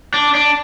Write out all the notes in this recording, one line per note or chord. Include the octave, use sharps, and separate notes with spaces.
D4
D4